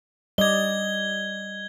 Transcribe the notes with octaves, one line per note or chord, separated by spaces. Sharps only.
G3 D5 D#5 G#6 G7